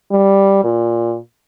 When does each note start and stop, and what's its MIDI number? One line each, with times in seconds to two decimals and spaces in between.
0.11 0.59 55
0.64 1.17 46